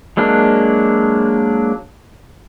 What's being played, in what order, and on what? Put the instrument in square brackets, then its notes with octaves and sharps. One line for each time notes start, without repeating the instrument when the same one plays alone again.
[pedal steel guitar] F#3 G#3 A#3 D4